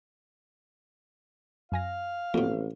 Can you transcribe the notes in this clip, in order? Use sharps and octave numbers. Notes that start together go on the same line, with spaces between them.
F#2 F5 G#5 A#6
A1 F2 B2 A#3